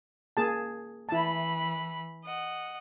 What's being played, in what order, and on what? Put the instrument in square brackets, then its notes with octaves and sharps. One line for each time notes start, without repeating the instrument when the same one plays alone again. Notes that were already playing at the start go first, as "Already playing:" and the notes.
[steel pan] A#3 G#4 A5
[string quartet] E3 B5 [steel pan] E4 A5
[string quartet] D#5 F#5